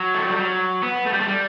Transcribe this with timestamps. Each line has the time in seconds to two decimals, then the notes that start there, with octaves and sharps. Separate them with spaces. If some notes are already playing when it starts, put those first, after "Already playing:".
Already playing: F#3
0.14 A3
0.27 G3
0.39 F#3
0.83 B3
1.06 A3
1.13 G3
1.20 A3
1.28 G3